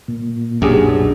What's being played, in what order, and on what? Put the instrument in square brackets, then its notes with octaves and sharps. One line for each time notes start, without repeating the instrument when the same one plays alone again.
[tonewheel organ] A#2
[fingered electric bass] B1 F#2 [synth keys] D4 G4 G#4